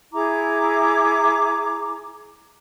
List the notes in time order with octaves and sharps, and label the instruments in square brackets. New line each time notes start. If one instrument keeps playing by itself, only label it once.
[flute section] E4 G#4 A#5 D6